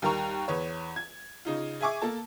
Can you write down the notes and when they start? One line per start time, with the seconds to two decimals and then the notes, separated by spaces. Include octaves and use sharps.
0.02 D#2 G3 A#4 A#5 C#6
0.48 E2 B4 C#5
0.96 G#6
1.45 C#3 D#4 F4
1.81 G#4 E5 G#5 C#6 D6
2.02 A#3 A4 A5